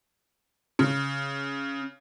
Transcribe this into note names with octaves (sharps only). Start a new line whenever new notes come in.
C#3